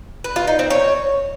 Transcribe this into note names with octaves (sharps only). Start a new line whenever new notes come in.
B4
F4
D#4
C4
C#5